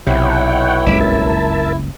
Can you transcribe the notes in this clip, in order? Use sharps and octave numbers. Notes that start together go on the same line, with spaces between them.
B1 C3 E4 C#5 F#5 G5
F#1 C#2 G2 B5 D6 E6
A#4 E5 A5